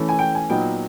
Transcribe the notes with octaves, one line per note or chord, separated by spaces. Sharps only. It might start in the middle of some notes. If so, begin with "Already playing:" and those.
Already playing: E3 A3 C#4
G#5
G5
G#5
A#2 F#3 B3 D#4 G5